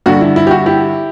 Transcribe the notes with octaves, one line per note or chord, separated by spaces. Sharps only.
G2 D3 F#4
E4
E4
G4
F#4
E4 G4